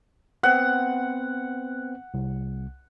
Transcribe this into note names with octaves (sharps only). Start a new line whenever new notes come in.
B3 C4 F#5
C2